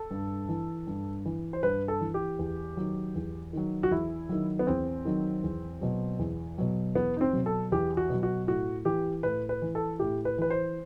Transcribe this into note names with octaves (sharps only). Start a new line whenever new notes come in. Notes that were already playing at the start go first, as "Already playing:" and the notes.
Already playing: A4
G2
E3
G2
E3
C5
G2 B4
A4
E3
G4
E2
D#3 F#3
E2
D#3 F#3
F#4
E2 E4
D#3 F#3
B3
E2 C4
D#3 F#3
E2
B2 F#3
E2
B2 F#3
E2 B3
D#4
C4
B2 F#3
A4
E2 G4
F#4
B2 F#3
F#4
A2 F#4
E3 G4
A2 B4
B4
E3
A4
A2 G4
B4
E3 B4
C5